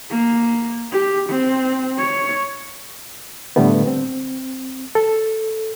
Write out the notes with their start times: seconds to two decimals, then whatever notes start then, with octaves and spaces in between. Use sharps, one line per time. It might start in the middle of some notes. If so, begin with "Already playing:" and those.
0.10 A#3
0.92 G4
1.30 C4
1.99 C#5
3.56 A2 D3 G3 A3 B3
3.87 C4
4.95 A4